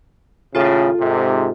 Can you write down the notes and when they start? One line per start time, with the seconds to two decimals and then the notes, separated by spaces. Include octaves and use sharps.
0.55 D#2 A2 C#3 F4 A4
1.00 G#2 C3